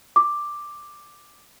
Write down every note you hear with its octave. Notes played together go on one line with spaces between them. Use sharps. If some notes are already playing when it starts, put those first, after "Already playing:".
D6